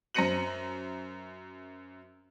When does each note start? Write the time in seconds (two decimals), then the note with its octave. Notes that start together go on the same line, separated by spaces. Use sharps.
0.14 F#2 C5 A#6 C#7 D#7 F#7